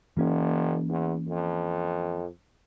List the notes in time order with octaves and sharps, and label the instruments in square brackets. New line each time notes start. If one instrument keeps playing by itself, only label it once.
[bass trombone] F#1 [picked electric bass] E3 A#3 C#4
[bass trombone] E2
F2